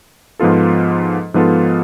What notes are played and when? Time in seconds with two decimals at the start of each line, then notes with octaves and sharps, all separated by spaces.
0.39 G#2 F3 B3 F4 A4
1.34 G#2 F3 B3 F4 A4